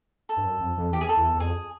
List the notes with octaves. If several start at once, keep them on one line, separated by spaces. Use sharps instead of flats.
A4
G2
F#2
F2
F2
E2 G4
G#4
A4
E2
E2
F2 G#4